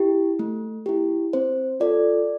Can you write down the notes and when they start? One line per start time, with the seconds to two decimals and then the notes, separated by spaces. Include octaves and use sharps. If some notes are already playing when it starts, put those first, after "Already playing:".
Already playing: E4 G4
0.39 A3
0.86 E4 G4
1.33 C4 C5
1.80 F4 A4 D5